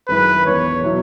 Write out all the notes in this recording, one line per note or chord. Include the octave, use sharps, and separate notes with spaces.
G#1 F#2 F#3 E4 G#4 B4
E1 E2 E3 C#5
B2 F#3 E4